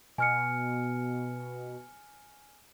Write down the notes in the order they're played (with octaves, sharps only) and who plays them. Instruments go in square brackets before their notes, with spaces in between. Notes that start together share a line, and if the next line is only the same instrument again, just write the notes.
[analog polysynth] B2 [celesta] G#5 F6 C#7